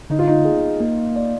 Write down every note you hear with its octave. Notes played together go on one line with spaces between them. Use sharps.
D3 D#4
F4
D#4
G#4
A#3
D5